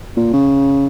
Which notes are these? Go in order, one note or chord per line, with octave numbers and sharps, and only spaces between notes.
A#2
C#3